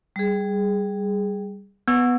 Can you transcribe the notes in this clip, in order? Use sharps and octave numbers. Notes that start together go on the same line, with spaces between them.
G3 G#4
B3